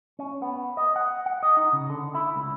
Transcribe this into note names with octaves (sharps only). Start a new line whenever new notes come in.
C#4
B3
D#5
F#5
F#5
D#5
D#4
C#3
D3
E4
C#2